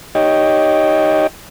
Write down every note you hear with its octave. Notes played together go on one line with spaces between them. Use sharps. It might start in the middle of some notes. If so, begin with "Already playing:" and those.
D#4 G4 C#5 D#5 G5